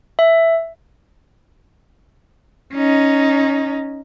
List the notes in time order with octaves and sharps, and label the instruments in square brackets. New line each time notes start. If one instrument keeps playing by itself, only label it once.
[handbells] E5
[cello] C#4 D#4